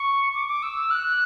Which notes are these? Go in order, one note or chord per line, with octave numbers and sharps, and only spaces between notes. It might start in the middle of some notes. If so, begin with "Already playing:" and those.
Already playing: C#6
D6
D6
E6
F#6